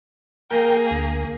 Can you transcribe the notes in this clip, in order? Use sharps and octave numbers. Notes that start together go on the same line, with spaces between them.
A#3 G#4 A#4 G5
D2